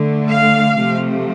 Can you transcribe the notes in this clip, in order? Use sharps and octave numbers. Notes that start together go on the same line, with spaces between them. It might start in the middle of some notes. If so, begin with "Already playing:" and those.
Already playing: D3 A3
F5
C3 F3 A3